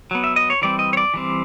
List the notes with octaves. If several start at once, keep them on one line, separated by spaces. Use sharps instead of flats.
F#3 B3
E5
D#5
C#5
E3 G3 C4 D5
D#5
C#5
D5
E3 G3 C4